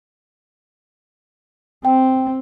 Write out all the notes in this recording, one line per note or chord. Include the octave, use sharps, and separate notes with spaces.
C4 G5